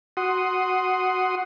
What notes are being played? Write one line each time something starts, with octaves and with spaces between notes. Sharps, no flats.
F#4 F#5 C6 D#6